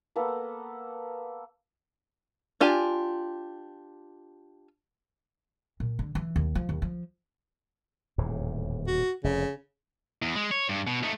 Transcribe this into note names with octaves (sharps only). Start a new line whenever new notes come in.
A#3 B3 A4 B4
D4 F4 G4 G#5
A#2
D3
E3
D#2
F3
D#2
F3
D#1 E2 A2
F#4
F1 C#3
E2
G#3
C#5
G2
B2
A3 D#4